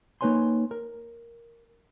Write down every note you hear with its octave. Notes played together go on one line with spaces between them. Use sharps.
A#3 D#4 B4 C#5 G#5 C6
A#4